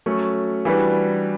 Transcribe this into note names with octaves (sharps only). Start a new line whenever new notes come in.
F#3 A3 C#4
E3 G3 D4 F#4 B4